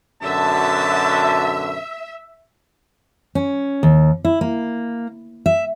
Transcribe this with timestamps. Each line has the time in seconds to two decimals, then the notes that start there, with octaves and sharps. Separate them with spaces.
0.23 F#2 B2 D3 E5 A5
3.35 C#4
3.83 D#2
4.25 E4
4.41 A#3
5.46 E5